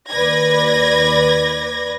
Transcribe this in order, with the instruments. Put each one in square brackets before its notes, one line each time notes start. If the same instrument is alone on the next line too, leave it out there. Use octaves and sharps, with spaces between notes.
[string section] D#2 B4 D5 G#6 A#6